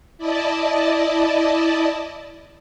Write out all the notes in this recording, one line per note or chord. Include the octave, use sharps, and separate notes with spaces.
E4 D5 D#5 A5